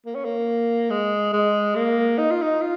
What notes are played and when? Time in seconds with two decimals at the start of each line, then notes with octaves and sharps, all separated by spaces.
0.06 A#3
0.15 C#4
0.25 A#3
0.90 G#3
1.33 G#3
1.75 A#3
2.18 D#4
2.31 F4
2.41 D#4
2.61 F4